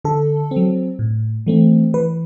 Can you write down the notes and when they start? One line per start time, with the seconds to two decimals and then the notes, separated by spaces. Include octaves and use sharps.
0.05 D3 A4
0.51 C4
0.56 F#3
0.99 A2
1.47 E3 A3 C4
1.94 E3 B4